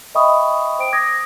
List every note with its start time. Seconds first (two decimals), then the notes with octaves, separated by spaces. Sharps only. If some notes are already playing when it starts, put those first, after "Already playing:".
0.15 D#5 E5 G5 B5 C#6 D#6
0.79 C5 G5 D7
0.92 D6 D#6 G#6 A#6